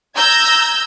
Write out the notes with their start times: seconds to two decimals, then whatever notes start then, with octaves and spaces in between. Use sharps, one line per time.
0.16 A#5 E6 G6 G#6 A#6